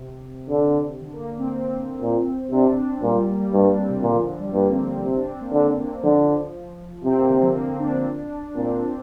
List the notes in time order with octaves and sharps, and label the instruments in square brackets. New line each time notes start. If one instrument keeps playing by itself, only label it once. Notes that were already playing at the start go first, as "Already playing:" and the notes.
Already playing: [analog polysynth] C3
[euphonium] D3
[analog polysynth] D3
A#3
C4
A#3
C4
[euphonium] A#2
[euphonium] C3 [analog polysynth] D4
[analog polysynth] D4
[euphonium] A#2 [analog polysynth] G3
[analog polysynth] G3
A#3
G3
[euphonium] G2 [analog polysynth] A#3
[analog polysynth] D4
C4
C3
[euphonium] A#2 [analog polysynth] D3
[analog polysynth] F3
D3
G3
[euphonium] G2 [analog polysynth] A#3
[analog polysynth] C4
C4
A#3
[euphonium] C3 [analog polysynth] C4
[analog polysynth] D4
C4
A#3
[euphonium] D3 [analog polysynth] C4
[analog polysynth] A#3
[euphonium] D3 [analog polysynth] F3
[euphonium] C3 [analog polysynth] C4
[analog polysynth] A#3
D3
F3
A#3
D4
[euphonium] A#2 [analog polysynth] C4
[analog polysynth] C4